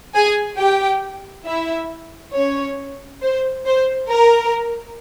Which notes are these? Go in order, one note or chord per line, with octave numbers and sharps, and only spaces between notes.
G#4 G#5
G4 G5
E4 E5
C#4 C#5
C5
C5
A#4